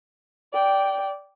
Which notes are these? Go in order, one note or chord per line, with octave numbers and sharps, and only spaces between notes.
D5 G5